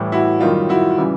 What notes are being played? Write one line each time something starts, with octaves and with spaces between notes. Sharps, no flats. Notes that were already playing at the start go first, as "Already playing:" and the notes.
Already playing: A2 E3 G3
E4 F#4
F#2 D#3 G3 D#4 F4
E4 F#4
C#3 E3 G3